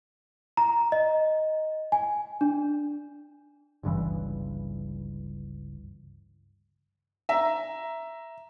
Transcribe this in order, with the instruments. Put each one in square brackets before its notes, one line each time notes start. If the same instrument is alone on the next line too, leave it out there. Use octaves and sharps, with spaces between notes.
[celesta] A#5
D#5
G#5
D4
[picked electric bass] G1 C#2 G2 E3
[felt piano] E5 A#5